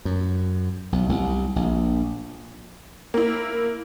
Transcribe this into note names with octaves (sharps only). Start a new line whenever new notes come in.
F#2
B1
C2
A#1
A#3 E4